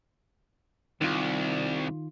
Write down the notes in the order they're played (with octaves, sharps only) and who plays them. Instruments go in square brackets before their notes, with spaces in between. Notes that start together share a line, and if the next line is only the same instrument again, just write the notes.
[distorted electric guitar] C2 [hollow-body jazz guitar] D#3 F4